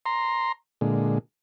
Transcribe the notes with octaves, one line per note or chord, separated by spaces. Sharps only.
A#5 C6
A#2 D3 G#3